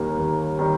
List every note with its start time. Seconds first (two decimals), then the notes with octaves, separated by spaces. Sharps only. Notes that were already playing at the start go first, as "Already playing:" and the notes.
Already playing: D#2 D#3 G3 A#3
0.19 D#2
0.59 D#3 G3